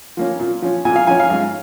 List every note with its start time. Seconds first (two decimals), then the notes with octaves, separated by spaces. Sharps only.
0.17 F3 A#3 C#4
0.40 A#2
0.62 F3 C#4
0.85 A#2 G#5
0.96 F5
1.07 F3 C#4 G#5
1.20 F5
1.30 G#2 F5